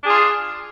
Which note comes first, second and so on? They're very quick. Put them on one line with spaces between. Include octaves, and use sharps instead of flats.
D4 G#4 F4